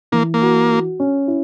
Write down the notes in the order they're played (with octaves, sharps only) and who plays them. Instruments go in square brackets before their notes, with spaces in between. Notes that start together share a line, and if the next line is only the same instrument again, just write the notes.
[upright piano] E3 [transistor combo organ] A#3
[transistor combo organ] A#3
[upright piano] F#4
F#4
C#4
E4